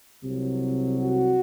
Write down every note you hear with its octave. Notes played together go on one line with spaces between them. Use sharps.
C2 C3 F#3
F#4